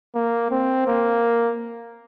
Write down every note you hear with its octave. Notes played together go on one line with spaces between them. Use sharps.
A#3
C4
A#3